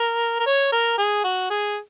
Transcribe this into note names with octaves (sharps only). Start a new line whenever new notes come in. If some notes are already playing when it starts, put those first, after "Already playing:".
Already playing: A#4
A#4
C#5
A#4
G#4
F#4
G#4